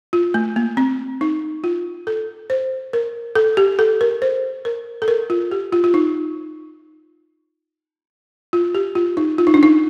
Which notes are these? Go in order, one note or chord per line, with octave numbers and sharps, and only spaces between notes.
F4
A3
A#3
C4
D#4
F4
A4
C5
A#4
A4
G4
A4
A#4
C5
A#4
A4
A#4
F4
G4
F4
F4
D#4
F4
G4
F4
D#4
F4
D#4
D4
D#4